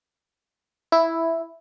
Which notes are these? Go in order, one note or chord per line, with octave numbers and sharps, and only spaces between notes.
E4